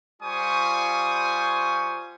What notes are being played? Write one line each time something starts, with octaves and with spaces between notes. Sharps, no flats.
G3 F4 C5 G#5 C#6 D#6